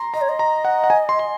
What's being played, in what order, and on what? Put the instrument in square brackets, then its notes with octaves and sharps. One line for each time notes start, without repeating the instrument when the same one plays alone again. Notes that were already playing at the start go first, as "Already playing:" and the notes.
Already playing: [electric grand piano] A#5 C6
[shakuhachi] D#5 [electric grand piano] A#5
[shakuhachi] C#5
D#5
[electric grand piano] A#5
F#5
F#5
G#5
C6
C6